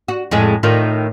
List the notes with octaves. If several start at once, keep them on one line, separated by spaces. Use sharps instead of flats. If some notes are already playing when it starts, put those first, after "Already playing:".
F#4
F2 A2 G#3
A2 D#3 F4